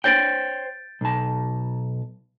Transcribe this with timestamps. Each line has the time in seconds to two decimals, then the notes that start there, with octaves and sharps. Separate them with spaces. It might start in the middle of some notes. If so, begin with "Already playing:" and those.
0.04 C5 C#5 G5 G6 A6 D7
1.01 B1 A5